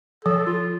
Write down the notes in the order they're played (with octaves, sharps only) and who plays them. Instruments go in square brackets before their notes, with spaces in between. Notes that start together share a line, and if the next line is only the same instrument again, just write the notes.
[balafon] F3 [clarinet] A4
[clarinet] F4